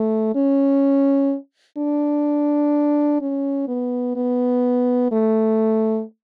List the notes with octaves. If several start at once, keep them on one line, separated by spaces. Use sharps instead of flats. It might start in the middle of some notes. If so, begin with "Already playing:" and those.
Already playing: A3
C#4
D4
C#4
B3
B3
A3